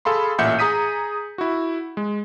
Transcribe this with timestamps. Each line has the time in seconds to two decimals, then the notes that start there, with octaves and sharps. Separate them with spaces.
0.05 G#4 A4 F5 B5 C6
0.38 A1 A#2 E5 F#5 G6 C#7
0.59 G#4 A#5 D#6 B6 D#7
1.38 E4 F#4
1.97 G#3